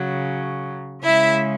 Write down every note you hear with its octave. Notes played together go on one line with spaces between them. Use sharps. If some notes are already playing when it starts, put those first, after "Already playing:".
Already playing: C#3 F#3
C#3 G#3 E4 E5